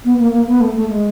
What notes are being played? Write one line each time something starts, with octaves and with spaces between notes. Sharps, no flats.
B3
A#3
A#3
B3
A3
A3
G#3